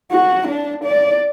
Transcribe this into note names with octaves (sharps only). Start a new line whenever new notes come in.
F#4
D4
D5